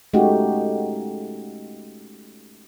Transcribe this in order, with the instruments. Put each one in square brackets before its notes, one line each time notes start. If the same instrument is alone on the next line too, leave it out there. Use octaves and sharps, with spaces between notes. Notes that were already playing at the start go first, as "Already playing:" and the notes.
[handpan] G#3 A3 C#4 D#4 F#4 G4